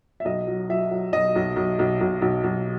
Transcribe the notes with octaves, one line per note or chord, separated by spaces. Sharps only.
E5
B1 D#5
F#3
F#3 E5
F#3
B1 D#5
B1
B1
B1
B1
B1
B1